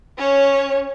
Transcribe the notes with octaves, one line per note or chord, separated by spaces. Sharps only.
C#4 C#5